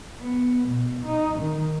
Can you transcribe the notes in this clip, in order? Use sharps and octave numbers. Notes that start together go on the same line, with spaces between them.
B3
B2
D#4
D#3